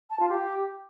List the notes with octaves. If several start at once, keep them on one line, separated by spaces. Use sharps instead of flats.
A5
F4
G4